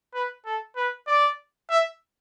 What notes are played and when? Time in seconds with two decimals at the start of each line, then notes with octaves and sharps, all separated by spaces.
0.14 B4
0.45 A4
0.76 B4
1.07 D5
1.70 E5